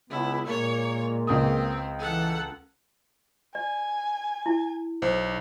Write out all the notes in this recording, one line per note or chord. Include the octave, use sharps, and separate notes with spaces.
C#2 B3 E4
A#2 G#3 A#3 C#5
C#2 C4 D#6
E3 A4 F#5
D5 G#5
E4
B1 C5